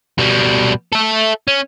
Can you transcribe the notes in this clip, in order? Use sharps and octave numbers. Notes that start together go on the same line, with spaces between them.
B2 G3
A4 E5
C#4